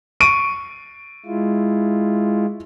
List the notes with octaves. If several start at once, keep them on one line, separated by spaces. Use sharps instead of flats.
C#6 D7 D#7
G#3 E4 F4